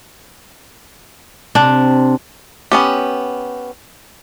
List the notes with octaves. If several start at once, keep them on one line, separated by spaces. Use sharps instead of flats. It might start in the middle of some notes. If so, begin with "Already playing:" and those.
C3 D4
B3 C#4 G4